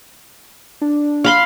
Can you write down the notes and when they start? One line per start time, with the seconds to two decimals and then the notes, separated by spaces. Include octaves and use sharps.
0.81 D4
1.24 F5 B5 C6